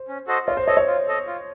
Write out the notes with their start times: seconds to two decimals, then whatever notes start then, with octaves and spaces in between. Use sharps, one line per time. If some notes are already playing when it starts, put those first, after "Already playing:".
Already playing: C5
0.08 C#4
0.27 F#4 A4 C5 D#5
0.47 F4 C#5
0.57 C5
0.67 A4 C#5 D#5
0.77 C#5
0.87 F4
1.08 A4 D#5
1.27 F4